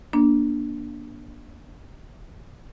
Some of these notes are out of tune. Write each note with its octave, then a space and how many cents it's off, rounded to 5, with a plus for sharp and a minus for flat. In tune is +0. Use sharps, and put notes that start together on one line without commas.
A#3 +40 D4 +0